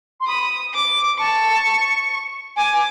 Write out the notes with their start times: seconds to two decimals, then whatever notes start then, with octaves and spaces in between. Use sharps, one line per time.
0.20 C6
0.27 B5 D#6
0.74 D6
1.19 A5 C#6
2.56 G#5 D6